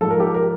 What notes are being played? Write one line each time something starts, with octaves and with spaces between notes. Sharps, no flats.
G#2 F3 A4
A#4
G4 A4
A#4